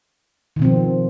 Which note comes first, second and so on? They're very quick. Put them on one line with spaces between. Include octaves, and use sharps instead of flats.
D#3 B2 C4 F3